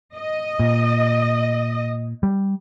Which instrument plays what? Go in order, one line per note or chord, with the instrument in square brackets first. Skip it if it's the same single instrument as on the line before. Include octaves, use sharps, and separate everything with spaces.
[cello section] D#5
[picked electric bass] A#2
G3